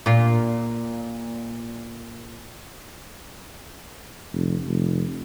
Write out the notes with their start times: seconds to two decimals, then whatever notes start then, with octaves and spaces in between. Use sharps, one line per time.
0.06 A#2 F4
4.33 F1
4.67 F1